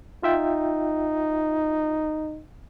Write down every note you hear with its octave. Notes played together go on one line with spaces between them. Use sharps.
D#4 F4 E5 G5